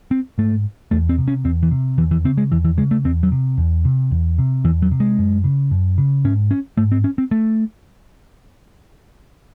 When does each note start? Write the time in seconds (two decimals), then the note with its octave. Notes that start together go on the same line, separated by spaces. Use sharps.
0.11 C4
0.38 G#2 A3
0.91 E2 A3
1.09 C4
1.18 C3
1.28 C#4
1.44 E2 C4
1.63 E3
1.71 C3
1.98 E2 E3
2.11 E3
2.24 C#3 C4
2.38 G#3
2.52 E2 E3
2.64 E3
2.77 C#3 G#3
2.91 A3
3.04 E2 C4
3.23 F#3
3.32 C3
3.58 E2
3.85 C3
4.11 E2
4.38 C3
4.64 E2 E3
4.82 F#3
4.91 C3
5.00 G#3
5.19 F#2
5.44 C#3
5.71 F#2
5.98 C#3
6.25 G#2 C#4
6.51 C#4
6.77 G#2 A3
6.92 C4
7.04 C#4
7.18 C4
7.31 A3